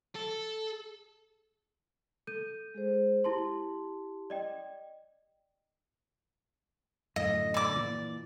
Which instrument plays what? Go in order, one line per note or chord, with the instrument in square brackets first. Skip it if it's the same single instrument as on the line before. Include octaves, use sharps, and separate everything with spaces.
[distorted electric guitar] A4
[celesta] A4 G6 D#7
[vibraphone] G#3 G#4 C5
[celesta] E4 A5 C6 [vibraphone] G4
[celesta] D5 D#5 G5
[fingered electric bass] F#2 A2 D3 [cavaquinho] D#5
[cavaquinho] D5 D6
[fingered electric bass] A#2 E3